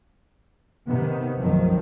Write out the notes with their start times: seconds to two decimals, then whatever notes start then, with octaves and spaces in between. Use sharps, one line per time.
0.87 C3 D#3 B3
1.38 F1 B1 F#2 D#3 F3